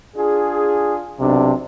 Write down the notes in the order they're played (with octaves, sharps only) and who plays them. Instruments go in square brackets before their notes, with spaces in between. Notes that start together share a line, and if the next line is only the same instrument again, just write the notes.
[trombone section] D4 F4 G#4
[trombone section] B1 D4 [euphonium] C3